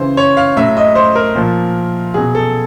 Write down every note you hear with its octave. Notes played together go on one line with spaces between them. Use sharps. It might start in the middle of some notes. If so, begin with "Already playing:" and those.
Already playing: C#3 E3 C5
C#5
F5
A2 F#3 E5
D#5
C5
A#4
A#2 F3
B2 F#3 G#4
A4